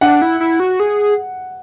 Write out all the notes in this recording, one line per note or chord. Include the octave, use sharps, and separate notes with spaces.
D4 F#5
E4
E4
F#4
G#4